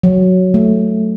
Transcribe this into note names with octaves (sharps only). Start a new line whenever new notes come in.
F#3
A3